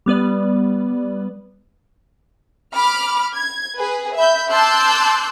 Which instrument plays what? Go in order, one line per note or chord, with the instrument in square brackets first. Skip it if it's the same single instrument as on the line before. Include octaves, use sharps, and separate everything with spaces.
[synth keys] G3 B3 B4 D5
[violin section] B5 D6 F6
G#6
G#4 B4
E5 B5 G6
A5 C6 D6 E6 F#6 G6